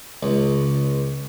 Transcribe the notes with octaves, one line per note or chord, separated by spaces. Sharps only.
C#2